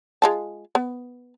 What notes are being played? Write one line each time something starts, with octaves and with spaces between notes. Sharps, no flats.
G#3 F4 A5
B3